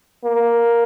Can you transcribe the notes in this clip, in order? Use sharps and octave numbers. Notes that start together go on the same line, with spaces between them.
A#3